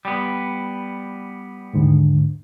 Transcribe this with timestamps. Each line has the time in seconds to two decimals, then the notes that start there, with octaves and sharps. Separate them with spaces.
0.05 G3 B3
1.73 D#2 G#2 D3